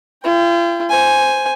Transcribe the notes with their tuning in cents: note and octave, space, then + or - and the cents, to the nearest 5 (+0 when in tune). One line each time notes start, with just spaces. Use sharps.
F4 -40 G5 +15
C5 +0 G#5 +0